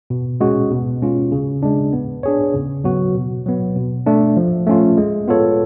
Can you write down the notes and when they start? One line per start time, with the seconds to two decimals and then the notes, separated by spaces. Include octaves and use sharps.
0.10 B2
0.40 G#3 C#4 F#4
0.71 B2
1.02 G#3 C#4 F4
1.32 C#3
1.63 G#3 D4
1.93 B3
2.23 D4 G#4 C#5
2.54 C#3
2.84 F#3 B3 F#4
3.15 B2
3.46 F#3 B3
3.76 B2
4.07 A3 D4
4.37 F3
4.67 A3 C#4 F4
4.97 G#3
5.28 B3 F4 A4 C#5